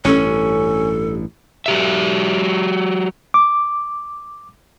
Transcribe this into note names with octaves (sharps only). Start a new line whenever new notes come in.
A1 G2 C#4 A4
F#3 G4 E5
D6